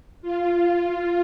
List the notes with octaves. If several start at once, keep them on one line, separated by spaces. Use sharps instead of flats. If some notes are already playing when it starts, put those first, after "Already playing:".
F4
F4